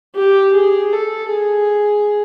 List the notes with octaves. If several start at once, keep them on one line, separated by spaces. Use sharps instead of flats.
G4
G#4
A4
G#4